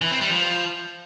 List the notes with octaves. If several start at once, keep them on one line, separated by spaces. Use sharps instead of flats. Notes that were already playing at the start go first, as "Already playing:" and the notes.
E3
C4
G3
F3